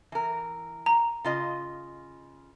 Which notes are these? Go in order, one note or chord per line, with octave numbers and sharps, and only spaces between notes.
E3 A#4
A#5
C#3 F4 D#5